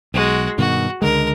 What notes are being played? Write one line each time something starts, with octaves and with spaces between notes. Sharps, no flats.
B1 G#3 F#4
G2 B2 D#3 F#4
C#2 D3 G#3 A#4